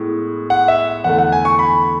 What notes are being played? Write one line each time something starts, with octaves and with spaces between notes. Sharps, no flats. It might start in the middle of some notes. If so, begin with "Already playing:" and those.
Already playing: A2 G#3 B3
F#5
E5
E2 D3 A3 F#5
F#5
G#5
C#6
B5